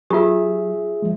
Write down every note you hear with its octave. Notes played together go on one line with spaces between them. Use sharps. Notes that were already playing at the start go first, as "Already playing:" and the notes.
F#3 F4 G4 G#4 E5
F3 G#3